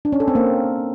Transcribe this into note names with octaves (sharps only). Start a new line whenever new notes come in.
D4
C#4
A4
C4
A#3